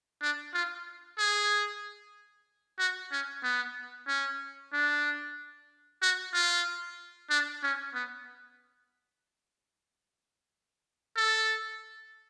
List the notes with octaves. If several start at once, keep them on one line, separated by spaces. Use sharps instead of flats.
D4
F4
G#4
F#4
C#4
B3
C#4
D4
F#4
F4
D4
C#4
B3
A4